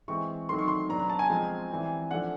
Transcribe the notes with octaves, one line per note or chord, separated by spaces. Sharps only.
E3 G#3 C4 C#6
D#3 F#3 A3 C4 C6
C#6
C6
B2 F#3 B3 D4 A#5
A#5
A5
G#5
F3 G#3 C4
E3 G3 C4
F3 A3 D4 F#5